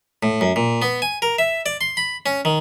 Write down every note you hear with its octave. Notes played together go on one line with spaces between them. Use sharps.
A2
F#2
A#2
B3
G#5
A#4
E5
D5
C6
B5
C#4
D#3